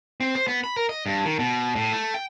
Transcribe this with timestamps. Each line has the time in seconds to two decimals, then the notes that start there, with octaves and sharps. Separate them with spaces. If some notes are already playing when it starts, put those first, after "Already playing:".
0.20 C4
0.36 C5
0.48 B3
0.64 B5
0.76 A#4
0.89 D#5
1.06 G2
1.25 D#3
1.39 B2
1.76 A2
1.92 A3
2.14 G5